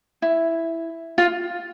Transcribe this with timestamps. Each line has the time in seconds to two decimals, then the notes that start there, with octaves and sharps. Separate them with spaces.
0.22 E4
1.18 F4